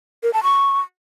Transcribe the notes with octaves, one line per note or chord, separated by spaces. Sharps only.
A#4
A5
C#6